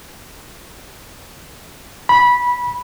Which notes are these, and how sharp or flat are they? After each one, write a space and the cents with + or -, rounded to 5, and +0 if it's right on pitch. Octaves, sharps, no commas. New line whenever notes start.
B5 -15